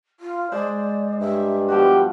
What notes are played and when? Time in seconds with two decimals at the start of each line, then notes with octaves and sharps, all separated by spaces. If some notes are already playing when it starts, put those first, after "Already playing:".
0.20 F4
0.52 G#3 C5 D5
1.20 G2 E5
1.68 F3 G3 B3 F#4 G4